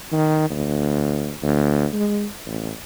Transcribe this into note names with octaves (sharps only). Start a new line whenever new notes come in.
D#3
D2
D2
G#3
A1